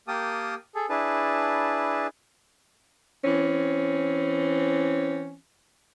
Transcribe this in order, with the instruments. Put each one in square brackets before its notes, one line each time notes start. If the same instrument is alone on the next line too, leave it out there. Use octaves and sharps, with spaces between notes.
[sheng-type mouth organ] A#3 G4 A#4 G5 A5 D#6
G#4 A4
D4 E4 G#4 B4 A5
[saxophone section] E3 C4 C#4